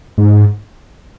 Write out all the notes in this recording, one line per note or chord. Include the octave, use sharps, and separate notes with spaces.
G#2